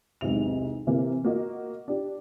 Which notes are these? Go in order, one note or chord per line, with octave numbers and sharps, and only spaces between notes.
B1 E2 G#2 C3 F7
C3 E3 A#3
A#3 F#4 D#5
D4 G4